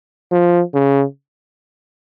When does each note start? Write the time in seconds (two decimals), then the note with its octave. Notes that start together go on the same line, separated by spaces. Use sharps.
0.32 F3
0.74 C#3